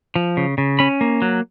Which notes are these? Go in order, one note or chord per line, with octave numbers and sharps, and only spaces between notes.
F3
C#3
C#3
C#4 B5
A#3
F#3